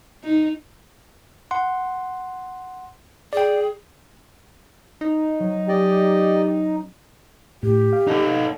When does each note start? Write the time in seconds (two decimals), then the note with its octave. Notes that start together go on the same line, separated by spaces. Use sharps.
0.24 D#4
1.51 F#5 C6
3.33 G#4 D5 G5
5.01 D#4
5.40 F#3
5.69 C#4 G4 D5 D#5
7.63 A2 G4
7.93 F5
8.08 D#4 A4